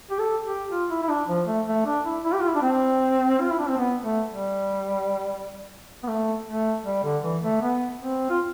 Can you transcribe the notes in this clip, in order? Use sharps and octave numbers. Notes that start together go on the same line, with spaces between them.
G4
A4
G4
F4
E4
E4
D4
F3
A3
A3
D4
E4
E4
G4
F4
E4
D4
C4
F4
E4
D4
C4
B3
A3
G3
B3
A3
A3
G3
D3
E3
A3
B3
C4
F4